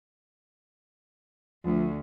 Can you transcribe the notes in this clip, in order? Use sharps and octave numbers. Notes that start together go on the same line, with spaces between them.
D2 F3